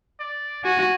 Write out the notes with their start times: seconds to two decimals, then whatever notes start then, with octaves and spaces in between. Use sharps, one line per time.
0.20 D5
0.64 F#4 G#5